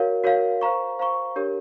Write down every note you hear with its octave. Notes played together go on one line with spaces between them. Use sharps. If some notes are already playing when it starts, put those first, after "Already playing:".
Already playing: F#4 A#4 C#5 F5
F#4 A#4 C#5 F5
C5 F5 A#5 C#6
C5 F5 A#5 C#6
D4 G4 A#4 C#5